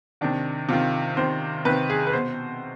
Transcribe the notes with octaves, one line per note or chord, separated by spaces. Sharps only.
C3 D#3 D4
C3 D#3 F4
C3 D#3 C5
C3 D#3 B4
G#4
B4
B2 C5